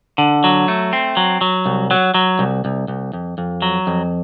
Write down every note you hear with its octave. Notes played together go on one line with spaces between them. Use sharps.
D3
F#3
A3
C4
F#3
F#3
C2
F#3
F#3
C2
C2
C2
F2
F2
F#3
F2